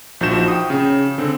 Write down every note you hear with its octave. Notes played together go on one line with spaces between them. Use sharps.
A#1 F3 D#4 F#4 G6 E7
G5 D#6
C#3
D3 C4